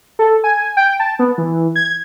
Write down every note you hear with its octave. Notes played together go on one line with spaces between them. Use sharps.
A4
G#5
G5
A5
B3
E3
G#6